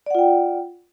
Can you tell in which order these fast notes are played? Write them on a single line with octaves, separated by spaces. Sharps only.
D5 F#5 F4 G5